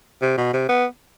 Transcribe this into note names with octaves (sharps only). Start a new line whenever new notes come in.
C3
B2
C3
B3